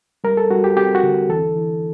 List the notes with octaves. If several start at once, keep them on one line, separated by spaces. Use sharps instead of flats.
G3 A#4
A4
G3 F#4
G4
C4 G4
F#4
D3
E3 A4
E3